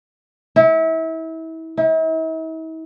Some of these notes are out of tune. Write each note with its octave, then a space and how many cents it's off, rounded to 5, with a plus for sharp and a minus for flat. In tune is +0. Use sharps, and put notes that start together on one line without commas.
E4 -30
E4 -45